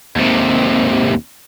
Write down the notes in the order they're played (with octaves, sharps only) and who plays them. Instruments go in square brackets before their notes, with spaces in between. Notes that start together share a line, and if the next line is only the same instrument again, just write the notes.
[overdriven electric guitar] D#2 C3